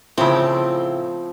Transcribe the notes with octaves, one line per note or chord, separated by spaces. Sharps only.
A2 C#3 F3 C4